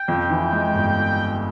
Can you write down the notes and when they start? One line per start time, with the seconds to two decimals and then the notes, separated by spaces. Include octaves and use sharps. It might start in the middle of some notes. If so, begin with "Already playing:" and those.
Already playing: G5
0.08 F2
0.30 E3
0.52 G#3
0.75 G1